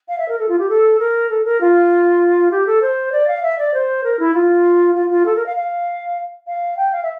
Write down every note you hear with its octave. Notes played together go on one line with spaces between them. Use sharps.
F5
E5
A#4
A4
F4
G4
A4
A#4
A4
A#4
F4
G4
A4
C5
D5
F5
E5
D5
C5
A#4
E4
F4
F4
F4
A4
A#4
F5
F5
F5
G5
F5
E5